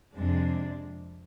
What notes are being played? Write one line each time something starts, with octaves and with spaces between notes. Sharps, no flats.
F2 C3 G#3 D4